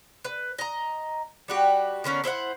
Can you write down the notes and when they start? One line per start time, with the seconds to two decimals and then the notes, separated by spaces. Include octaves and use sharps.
0.25 B4
0.58 D#5 A#5
1.48 G3 F#4 G4
2.04 D3 B3 C#4 A#4
2.24 E4 C5 E5 F#5